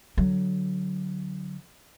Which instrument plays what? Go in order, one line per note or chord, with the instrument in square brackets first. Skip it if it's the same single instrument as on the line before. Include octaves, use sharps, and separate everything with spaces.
[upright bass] D3 F#3